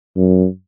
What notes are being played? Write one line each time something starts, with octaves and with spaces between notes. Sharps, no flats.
F#2